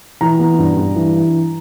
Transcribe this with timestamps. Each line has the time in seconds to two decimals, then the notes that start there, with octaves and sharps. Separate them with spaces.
0.21 E3 A#5
0.39 B3
0.59 G2
0.77 G2
0.96 E3